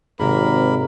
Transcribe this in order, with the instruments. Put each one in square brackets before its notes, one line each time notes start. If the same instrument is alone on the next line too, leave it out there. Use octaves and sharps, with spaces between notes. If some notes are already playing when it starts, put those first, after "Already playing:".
[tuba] G#1 [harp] G#2 C3 F#3 [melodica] A#3 A#4 B5